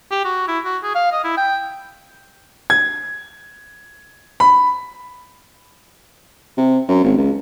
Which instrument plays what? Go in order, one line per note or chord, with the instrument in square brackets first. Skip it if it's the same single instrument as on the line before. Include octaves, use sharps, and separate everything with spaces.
[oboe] G4
F#4
E4
F#4
G#4
F5
D#5
E4
G5
[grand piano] G#6
B5
[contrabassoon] C3
F#2
G#1
C#2